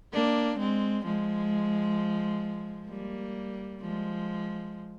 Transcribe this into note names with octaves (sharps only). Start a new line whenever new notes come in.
A#3 D4
G#3 C4
F3 G#3
G3 A#3
F3 G#3